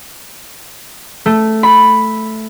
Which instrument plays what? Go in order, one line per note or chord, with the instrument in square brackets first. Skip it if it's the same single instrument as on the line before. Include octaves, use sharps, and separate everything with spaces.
[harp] A3
B5